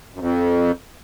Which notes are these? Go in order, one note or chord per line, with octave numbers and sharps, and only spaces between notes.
F#2
F2